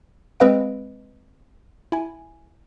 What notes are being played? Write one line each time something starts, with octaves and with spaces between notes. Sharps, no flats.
G#3 C4 B4 D#5 F5 D7
E4 G#5